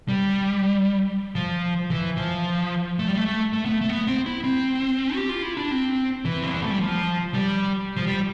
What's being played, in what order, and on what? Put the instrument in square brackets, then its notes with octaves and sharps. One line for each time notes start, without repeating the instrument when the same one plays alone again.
[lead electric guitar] G3
F3
E3
F3
A3
G3
A3
A3
B3
A3
A3
B3
C4
E4
C4
G4
F4
E4
D4
C4
E3
C4
B3
A3
G3
F3
G3
F3
G3